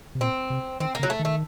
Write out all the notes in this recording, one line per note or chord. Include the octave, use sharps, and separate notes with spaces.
C3
A#2 C4
C3
D#3 C4
C#3 A#3
F#3
A3
D#3
A3